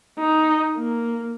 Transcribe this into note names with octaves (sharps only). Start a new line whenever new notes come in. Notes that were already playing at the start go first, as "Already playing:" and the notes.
D#4
A#3